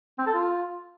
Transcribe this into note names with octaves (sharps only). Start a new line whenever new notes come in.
C4
A4
F4